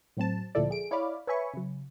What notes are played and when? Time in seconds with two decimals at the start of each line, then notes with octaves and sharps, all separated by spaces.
0.17 A2 F#3 C4 A5
0.55 D2 A#2 F3 E4 A4 D5
0.71 G#4 D7
0.91 E4 C#5 D5 F5 B5 D6
1.27 B4 C#5 E5 G#5 B5 C#6
1.54 C#3 F#3